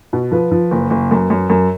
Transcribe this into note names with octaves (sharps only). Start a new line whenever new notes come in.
B2
F3 B4
F3
F#1
F#1
F#2
F#2
F#2